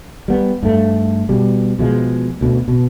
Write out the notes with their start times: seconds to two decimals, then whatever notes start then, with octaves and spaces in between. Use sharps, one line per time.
0.28 G3 B3
0.63 G2 A3
1.29 B2 G3
1.79 B2 F3 G#3
2.41 D2 B2
2.68 B2